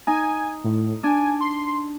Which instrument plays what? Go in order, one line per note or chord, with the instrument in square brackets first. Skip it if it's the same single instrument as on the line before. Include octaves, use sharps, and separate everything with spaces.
[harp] D#4 [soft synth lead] G#5
[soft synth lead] A2
[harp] D4 [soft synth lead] G#5
[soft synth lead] C6